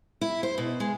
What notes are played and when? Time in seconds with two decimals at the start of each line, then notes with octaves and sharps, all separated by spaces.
0.21 E4
0.43 C5
0.58 B2
0.80 G#3